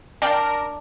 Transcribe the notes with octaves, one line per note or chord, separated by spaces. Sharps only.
D4 A#4 D5 F5 G5